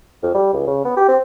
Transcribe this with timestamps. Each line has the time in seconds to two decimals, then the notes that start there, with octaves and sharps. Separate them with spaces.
0.23 F2
0.34 G3
0.53 C#2
0.67 C#3
0.85 B3
0.97 G4
1.09 C4